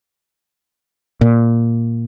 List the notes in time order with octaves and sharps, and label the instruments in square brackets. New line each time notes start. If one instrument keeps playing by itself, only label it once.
[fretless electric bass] A#2